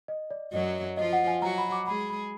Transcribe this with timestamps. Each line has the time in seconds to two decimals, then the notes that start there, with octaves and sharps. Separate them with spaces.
0.08 D#5
0.31 D5
0.53 F#2 F#3 D#5
0.97 F3 F4 D#5
1.13 F#5
1.28 G#5
1.42 F#3 F#4 A#5
1.58 B5
1.72 D6
1.87 G#3 G#4 B5
2.10 B5